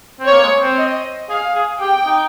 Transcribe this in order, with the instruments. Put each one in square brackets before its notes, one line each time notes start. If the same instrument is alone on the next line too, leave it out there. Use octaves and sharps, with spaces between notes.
[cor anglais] C4
[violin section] C#5
[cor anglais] A#3
G#3
C4
[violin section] D#5
[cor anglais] G#4 [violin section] F5
[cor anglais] G#4
[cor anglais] G4 [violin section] G5
[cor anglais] D#4